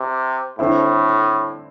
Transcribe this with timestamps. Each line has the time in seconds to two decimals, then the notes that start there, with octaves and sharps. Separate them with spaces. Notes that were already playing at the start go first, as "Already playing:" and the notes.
Already playing: C3
0.59 A2 D3 C4 E4